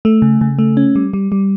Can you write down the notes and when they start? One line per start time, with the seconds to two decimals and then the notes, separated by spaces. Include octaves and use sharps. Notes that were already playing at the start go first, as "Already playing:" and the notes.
0.05 A3
0.22 C#3
0.41 C#3
0.59 A3
0.77 C#4
0.96 G3
1.13 G3
1.32 G3